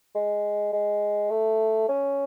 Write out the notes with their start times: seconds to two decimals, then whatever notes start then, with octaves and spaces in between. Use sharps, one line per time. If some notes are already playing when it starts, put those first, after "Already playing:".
0.15 G#3
0.73 G#3
1.30 A3
1.89 C#4